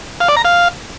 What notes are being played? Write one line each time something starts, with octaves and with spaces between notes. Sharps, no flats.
F5
D5
A#5
F5